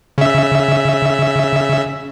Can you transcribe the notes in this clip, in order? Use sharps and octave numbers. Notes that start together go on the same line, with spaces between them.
C#3 E5